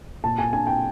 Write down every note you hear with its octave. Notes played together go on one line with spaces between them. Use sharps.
A#2 A5
G#5
D4 G#5
G5